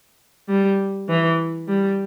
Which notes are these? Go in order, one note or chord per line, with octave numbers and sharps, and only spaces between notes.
G3
E3
G3